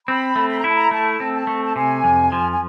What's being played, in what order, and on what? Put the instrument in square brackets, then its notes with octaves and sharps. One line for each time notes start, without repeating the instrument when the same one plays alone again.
[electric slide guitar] C4 [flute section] B5
[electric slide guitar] A3
[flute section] B5
A#5
[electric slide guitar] E4 [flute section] A5
[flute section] A#5
[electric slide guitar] A3 [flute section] A5
[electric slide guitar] C4
[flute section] A5
[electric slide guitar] A3
[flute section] A5
[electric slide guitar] C3 [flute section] G#5
[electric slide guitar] F2
F3
[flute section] G#5